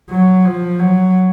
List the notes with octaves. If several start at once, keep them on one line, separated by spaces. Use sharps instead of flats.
F#3
F3
F#3